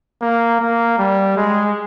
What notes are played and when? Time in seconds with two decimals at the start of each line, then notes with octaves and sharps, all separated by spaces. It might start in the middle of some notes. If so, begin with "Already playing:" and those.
0.21 A#3
0.60 A#3
0.98 G3
1.37 G#3